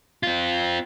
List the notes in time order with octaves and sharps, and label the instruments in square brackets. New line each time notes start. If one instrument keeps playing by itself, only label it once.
[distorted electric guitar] C4 F4